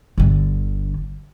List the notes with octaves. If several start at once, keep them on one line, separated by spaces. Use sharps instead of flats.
G1 D3